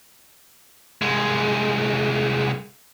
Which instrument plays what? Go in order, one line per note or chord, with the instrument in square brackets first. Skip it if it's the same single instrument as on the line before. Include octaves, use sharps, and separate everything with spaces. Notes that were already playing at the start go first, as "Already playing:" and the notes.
[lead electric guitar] C2 G#3